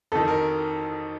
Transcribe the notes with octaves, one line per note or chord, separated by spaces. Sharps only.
F2 D#3 A4
A#4